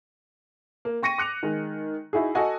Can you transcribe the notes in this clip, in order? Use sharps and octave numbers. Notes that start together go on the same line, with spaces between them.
A#3
G5 C#6 A#6 C#7 D#7
D6 F#6 C#7 F7
D#3 G#3
D#4 E4 F#4 G#4
F#4 A4 D#5 F#5 G#5